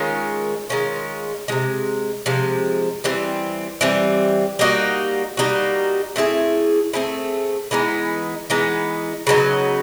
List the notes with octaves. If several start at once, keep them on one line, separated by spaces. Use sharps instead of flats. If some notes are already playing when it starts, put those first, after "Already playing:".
Already playing: D#3 G#3 C#4 F4
D#3 G#3 C#4 F4
C3 F3 G#3
C3 F3 G#3
E3 G3 C4
E3 G3 C4
G3 A#3 D#4 F#4
G3 A#3 D#4 F#4
A3 C4 E4 G#4
A3 C4 E4 G#4
E3 G#3 B3 D#4
E3 G#3 B3 D#4
C#3 F#3 B3 D#4